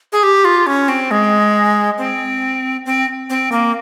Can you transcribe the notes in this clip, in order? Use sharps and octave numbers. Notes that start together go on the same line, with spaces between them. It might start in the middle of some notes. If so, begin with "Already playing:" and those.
G#4
G4
F4
C#4
C4
G#3
C4
C4
C4
A#3